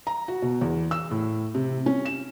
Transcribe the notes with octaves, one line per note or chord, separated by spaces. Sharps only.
A#5
F#4
B2
E2
E6
A2
C3
C#4
E7